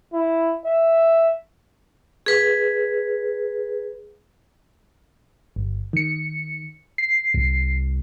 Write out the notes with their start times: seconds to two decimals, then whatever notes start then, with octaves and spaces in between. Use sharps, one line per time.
0.14 E4
0.66 E5
2.26 G#4 B4
5.56 G1
5.93 D#3 C#7
6.98 C7
7.34 C2